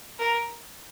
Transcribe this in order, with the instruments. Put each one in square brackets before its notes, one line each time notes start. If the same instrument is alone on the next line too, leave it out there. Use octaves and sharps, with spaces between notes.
[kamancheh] A#4